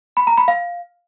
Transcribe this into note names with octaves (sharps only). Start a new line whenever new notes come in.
B5
A#5
B5
F5